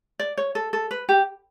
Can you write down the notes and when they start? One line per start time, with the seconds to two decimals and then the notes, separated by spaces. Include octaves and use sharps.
0.19 D5
0.37 C#5
0.55 A4
0.73 A4
0.91 B4
1.09 G4